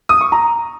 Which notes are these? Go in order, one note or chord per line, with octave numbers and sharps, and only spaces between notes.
D#6
C#6
A#5